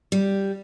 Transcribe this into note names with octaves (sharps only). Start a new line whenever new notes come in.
G3